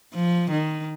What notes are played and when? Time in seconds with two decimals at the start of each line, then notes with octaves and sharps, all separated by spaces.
0.15 F3
0.52 D#3